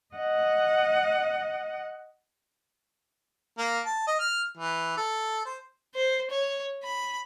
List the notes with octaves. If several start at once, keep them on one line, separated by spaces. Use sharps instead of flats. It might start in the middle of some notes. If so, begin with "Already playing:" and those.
D#5 F#5
A#3
A5
D#5
F6
E3
A4
C5
C5
C#5
B5